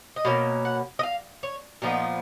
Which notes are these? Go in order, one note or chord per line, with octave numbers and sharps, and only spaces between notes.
D#5
B2 A#3 C#4 F5
F#5
D#5
F5
C#5
A#2 F3 B3 D#4